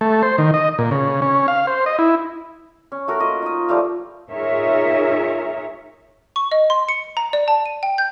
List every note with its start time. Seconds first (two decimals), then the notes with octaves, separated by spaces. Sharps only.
0.01 A3
0.23 C5
0.38 D#3
0.54 D#5
0.79 A#2
0.91 C#3
1.22 C#4
1.48 F5
1.67 C5
1.86 D#5
1.99 E4
2.92 C#4
3.08 A3 F#4 A#4
3.20 A#3 F4 D#5
3.42 D#4 D#5
3.69 F3 G3 A3 F5
4.32 D#4 F4 G#4 A#4 C#5 E5
6.36 C#6
6.52 D#5
6.70 C6
6.89 C#7
7.17 A#5
7.33 D5
7.48 A5
7.66 D#7
7.83 G5
7.98 G6